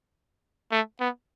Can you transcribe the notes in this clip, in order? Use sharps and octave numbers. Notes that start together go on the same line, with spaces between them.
A3
B3